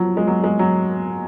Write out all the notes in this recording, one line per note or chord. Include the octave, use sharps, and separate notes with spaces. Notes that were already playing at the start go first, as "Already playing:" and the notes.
Already playing: F3 F#3
G#3
F#3
G#3
F#3